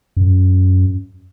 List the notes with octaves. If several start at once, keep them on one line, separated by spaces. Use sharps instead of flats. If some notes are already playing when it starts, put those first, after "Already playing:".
F#2